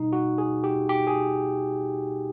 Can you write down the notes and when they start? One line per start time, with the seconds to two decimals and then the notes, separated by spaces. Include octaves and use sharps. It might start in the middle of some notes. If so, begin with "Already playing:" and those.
Already playing: B2 G3 D#4
0.13 F#4
0.38 G#4
0.64 G4
0.89 G4
1.07 G#4